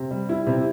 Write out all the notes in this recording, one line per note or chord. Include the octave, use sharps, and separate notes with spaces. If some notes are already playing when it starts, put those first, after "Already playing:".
Already playing: C3
G3
E4
C3